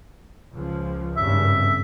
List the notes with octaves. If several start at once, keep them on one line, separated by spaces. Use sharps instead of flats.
C#2 F3
G#1 G2 C#3 E5